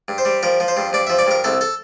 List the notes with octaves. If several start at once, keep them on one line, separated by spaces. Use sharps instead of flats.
G2
C5
G3
F3 A#4
F3
C5
G2
G2 D5
F3 E5
D5
G2 A#4
C2 A4
A4